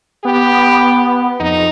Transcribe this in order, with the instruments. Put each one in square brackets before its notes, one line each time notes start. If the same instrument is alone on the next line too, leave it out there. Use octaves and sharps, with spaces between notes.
[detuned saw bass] B3 [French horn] G4
[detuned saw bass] F2 [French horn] D#4